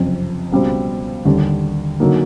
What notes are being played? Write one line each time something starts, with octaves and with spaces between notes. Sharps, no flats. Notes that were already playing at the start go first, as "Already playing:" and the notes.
Already playing: F#1 F2 C3
C#2 B2 G3 C4
D#2 D3 G3
D3 F#3 A#3 D#4